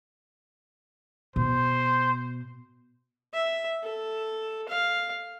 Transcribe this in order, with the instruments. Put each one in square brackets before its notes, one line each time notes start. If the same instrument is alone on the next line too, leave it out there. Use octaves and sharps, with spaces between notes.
[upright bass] B2 [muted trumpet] C5
[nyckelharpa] E5
A4
F5